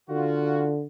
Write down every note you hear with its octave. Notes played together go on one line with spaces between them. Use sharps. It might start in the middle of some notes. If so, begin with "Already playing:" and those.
D3 F4 F#4